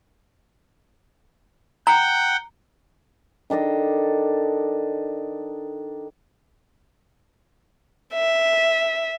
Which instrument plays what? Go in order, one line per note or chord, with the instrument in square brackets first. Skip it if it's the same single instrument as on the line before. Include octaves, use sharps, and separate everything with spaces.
[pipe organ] F#5 G5 [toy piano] A#5
[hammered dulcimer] D#3 D4 A4 D#5
[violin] E5